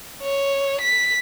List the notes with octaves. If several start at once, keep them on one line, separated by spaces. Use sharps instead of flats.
C#5
B6